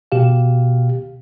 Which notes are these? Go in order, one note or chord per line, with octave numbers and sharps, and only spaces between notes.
B2 G4 F5